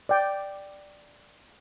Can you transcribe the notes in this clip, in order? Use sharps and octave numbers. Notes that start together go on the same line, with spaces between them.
D5 G5